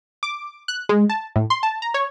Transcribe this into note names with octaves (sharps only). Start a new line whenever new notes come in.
D6
F#6
G#3
A5
A2
C6
A5
A#5
C#5